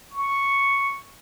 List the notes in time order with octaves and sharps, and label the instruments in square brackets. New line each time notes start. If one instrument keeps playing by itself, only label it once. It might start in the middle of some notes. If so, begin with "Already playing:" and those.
[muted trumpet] C#6